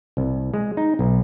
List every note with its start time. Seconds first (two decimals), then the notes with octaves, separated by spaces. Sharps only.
0.17 C2
0.54 G#3
0.77 D#4
0.99 B1